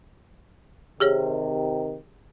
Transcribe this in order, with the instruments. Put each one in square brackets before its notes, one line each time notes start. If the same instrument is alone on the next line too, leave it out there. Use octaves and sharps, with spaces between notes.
[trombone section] C3 D#3 [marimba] G4 G#4 C#5